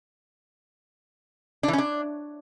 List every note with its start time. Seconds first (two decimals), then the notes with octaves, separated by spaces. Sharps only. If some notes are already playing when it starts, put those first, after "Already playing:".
1.63 D4
1.68 E3
1.73 C#4
1.78 D4